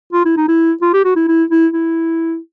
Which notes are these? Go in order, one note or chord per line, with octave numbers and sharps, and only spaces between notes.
F4
E4
D#4
E4
F4
G4
F#4
E4
E4
E4
E4